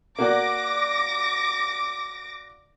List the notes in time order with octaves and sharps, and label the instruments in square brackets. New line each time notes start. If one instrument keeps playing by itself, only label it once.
[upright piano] A#3 F#4 D5 [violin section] D6 A#6